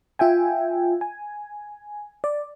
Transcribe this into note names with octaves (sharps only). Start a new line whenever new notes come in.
F4 E5 G5 G#5
G#5
D5